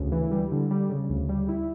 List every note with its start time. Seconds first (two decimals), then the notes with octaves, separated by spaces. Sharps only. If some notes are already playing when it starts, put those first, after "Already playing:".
Already playing: D2 C#3
0.12 E3
0.31 G3
0.52 D3
0.71 G3
0.90 C#3
1.10 D2
1.29 G3
1.49 E4